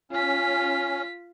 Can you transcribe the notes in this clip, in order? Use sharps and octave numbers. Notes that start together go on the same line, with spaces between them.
C#4 F4 B6